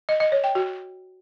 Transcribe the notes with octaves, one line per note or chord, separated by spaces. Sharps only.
D#5
D#5
C#5
G5
F#4